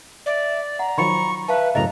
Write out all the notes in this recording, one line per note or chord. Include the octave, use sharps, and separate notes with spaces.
D5 E5
F#5 A#5
D#3 F3 F#3 B5 C#6
B4 E5 F5 A5
F#2 A2 C#3 D#5 A#5